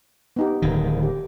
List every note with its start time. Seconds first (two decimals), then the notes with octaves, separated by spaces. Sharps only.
0.36 B3 D#4 G4
0.62 D1 D#3
1.03 G4